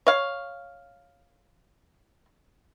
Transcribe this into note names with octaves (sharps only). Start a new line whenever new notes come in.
C#5 F5